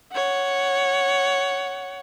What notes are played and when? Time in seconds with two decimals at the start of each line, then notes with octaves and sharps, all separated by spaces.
0.12 C#5 F#5